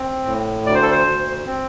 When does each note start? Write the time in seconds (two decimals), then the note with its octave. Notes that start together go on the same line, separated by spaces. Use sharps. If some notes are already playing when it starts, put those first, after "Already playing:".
Already playing: C4
0.25 A2
0.66 D2 D5
0.75 C5
0.83 A4
0.91 C5
1.07 D2
1.46 C4